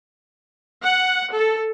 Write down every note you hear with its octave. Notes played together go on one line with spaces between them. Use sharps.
F#5
A4